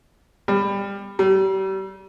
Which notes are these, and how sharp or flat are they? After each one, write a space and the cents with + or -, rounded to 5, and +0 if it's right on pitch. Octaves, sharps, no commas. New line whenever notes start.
G3 +25
G3 -35